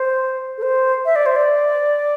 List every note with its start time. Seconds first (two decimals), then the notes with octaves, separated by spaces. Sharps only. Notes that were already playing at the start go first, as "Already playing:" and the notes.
Already playing: C5
0.58 A4
0.63 C5
1.05 E5
1.16 D5
1.26 C5
1.36 D5